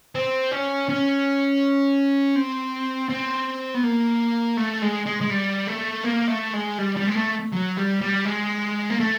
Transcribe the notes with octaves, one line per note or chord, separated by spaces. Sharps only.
C4
C#4
C#4
C4
C4
B3
A#3
A3
G#3
G#3
G#3
G3
A3
A#3
A3
G#3
G3
G3
G#3
A3
F#3
G3
G3
G#3
A#3
A3